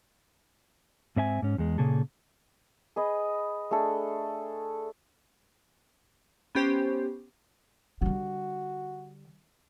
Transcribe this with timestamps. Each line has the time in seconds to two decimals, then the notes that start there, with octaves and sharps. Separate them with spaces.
1.16 G#2 C4 E5 G#5
1.42 G#2 C#4
1.58 E2 G#3
1.78 A#2 C#3 A#3 G#4 A4
2.96 G#4 B4 D#5
3.71 A3 D4 G#4 A4
6.55 B3 C#4 G4 C5
8.02 D3 G3 F#4